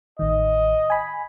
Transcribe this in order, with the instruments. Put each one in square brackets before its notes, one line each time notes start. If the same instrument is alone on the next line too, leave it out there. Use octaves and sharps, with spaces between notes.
[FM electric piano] A1 D#3 [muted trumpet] D#5
[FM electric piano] G#5 B5